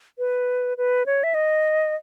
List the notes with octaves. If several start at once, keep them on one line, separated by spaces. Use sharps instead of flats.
B4
B4
C#5
E5
D#5